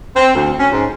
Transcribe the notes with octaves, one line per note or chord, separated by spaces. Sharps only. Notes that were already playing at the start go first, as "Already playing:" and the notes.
C4
D2
C#4
G#2